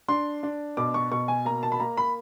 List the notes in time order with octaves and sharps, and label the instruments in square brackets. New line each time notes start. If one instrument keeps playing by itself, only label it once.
[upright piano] D4 C6
D4
B2 D6
C#6
B2 C#6
G#5
A#3 A#5
A5
B5
A#3 A#5
B5